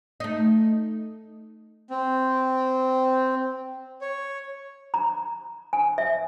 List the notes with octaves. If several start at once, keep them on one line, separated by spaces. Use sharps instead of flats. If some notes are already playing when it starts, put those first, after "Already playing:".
A3 D#4
C4
C#5
A#5
G#5
E5